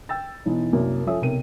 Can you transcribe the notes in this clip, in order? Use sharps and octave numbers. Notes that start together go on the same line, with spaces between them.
G5 E6 A6
B1 E3 D#4
C2 F#2 A#3
F3 C#4 A4 C#5 E5 D#6
B1 C3 A#4 D#7